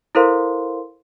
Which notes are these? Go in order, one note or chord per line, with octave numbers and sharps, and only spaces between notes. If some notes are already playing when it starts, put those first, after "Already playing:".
E4 A4 A#4 C5 F5 C6